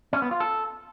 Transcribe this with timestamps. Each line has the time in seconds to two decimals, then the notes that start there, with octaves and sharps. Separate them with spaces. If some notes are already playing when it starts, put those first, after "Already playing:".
0.13 C#4
0.22 B3
0.31 F4
0.40 A4